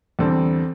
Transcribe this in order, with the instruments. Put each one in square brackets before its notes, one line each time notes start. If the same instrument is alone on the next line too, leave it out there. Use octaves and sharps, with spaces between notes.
[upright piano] E2 D3 G3 C4 A4